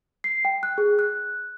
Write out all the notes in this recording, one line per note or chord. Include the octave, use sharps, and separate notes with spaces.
C7
G5
F#6
G#4
F#6